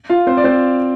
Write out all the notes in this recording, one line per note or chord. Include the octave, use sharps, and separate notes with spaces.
F4 F5
C4 C5
D5
C4 C5